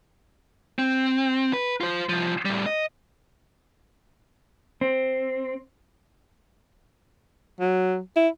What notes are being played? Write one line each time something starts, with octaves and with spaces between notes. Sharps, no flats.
C4
B4
F4 C5
C2 F3
A2 G3
D#5
C4
F#3
E4